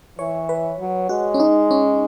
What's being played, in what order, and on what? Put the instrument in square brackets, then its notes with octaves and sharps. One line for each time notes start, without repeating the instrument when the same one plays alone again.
[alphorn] E3 [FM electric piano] C#5
[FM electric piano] B4
[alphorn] F#3
[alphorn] G#3 [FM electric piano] F#4
[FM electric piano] C#4
D#4
C#4